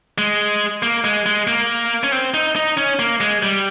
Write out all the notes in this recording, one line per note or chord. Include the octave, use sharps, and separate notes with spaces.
G#3
A#3
G#3
G#3
A#3
C#4
C4
D#4
D#4
C#4
A#3
G#3
G3